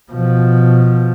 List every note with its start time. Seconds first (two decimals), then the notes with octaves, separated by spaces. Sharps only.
0.11 B2 F3